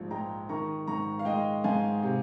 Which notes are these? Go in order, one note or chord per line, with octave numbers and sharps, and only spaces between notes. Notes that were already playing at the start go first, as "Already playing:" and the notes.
Already playing: A#1 G#2 F3
G#3 G5 A#5
D#3 A#5 C#6
G#2 A#5 C#6
F5
G#3 D#5 G5
G#2 F5 G#5
C3